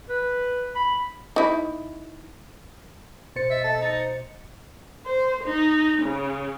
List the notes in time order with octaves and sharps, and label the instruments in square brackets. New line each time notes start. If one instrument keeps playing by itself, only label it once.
[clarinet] B4
B5
[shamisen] D#4 E4
[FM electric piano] B2 C5 C#7 [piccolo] A6
[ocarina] D#5 [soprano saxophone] E5
[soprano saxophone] A4
D#4
[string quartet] C5
D#4
C#3